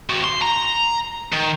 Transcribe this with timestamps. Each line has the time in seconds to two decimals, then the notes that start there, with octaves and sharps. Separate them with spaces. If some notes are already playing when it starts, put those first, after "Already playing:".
0.10 C4 F#4
0.24 C6
0.42 A#5
1.33 D#3